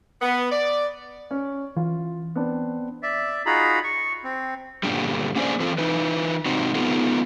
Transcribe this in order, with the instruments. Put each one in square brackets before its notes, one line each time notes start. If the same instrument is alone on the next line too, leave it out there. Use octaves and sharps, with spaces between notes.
[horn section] B3
D5
[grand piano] C#4
[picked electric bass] E3 [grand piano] F4
[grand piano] B3 C4 D4
[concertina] D5 E5
D#4 F4 F#4 G#4 A#5 B5
C#6
C4
[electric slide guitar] G2 A#2 D3 G3
A#3 C#4 G#4 A4 C5 D5
E3 C4 F4 A4
E3 D#4 B4
G#2 C3 C4 D#4 F#4
B3 D#4 F4 G#4 A#4